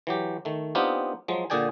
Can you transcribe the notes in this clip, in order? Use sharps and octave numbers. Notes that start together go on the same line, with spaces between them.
E3 F#3 G4
D#3 A3
B3 C4 D4 D#4 F4 G4
F3 F#3 G#3
A#2 D3 G#4 D5 G5 G#5